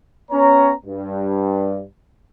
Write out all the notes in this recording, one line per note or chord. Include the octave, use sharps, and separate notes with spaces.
B3 C#4 C#5 A#5
G2